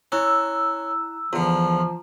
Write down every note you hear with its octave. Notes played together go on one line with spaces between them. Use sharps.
C#4 E4 A#5 E6 F#6
E2 D3 F3 F4 A#5